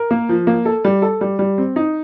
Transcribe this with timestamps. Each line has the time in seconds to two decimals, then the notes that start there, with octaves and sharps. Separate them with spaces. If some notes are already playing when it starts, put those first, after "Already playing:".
Already playing: A#4
0.11 A#3
0.29 F3
0.47 A#3
0.65 A4
0.85 G3
1.02 A4
1.21 G3
1.39 G3
1.58 C4
1.76 D#4